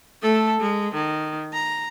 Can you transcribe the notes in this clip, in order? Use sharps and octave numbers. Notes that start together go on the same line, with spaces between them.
A3 A4
G#3
D#3
A#5